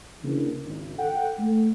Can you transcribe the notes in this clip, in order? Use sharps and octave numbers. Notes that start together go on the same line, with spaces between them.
C#3 E3 A#3 D4
G#1
A4 F#5 G5
A3